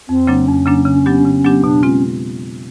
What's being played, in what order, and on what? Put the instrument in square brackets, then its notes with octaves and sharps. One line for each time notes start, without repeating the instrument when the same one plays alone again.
[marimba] F2 [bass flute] C4
[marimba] C#3 F#3 A#3 D4
[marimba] F2 [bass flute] C#4
[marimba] C#3 F#3 A#3 D4
C#3
F#3 B3 D4 G4
C#3
F#3 B3 D4 G4
[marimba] B2 [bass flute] D4
[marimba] G#3 C4 F4 [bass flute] C#4